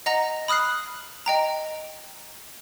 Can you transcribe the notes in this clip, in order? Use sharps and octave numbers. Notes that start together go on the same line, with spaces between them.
D#5 F#5 A#5 A#6 F7
B5 D#6 F6 F#6 C7
D#5 G5 A#5